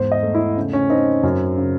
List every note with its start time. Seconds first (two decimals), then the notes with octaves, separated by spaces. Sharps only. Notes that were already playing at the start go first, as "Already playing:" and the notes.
Already playing: E2 G#2 C5
0.12 D#5
0.23 A3
0.35 E4
0.57 C#3
0.73 C#4
0.90 C4 D#4
1.23 F#2
1.57 C#3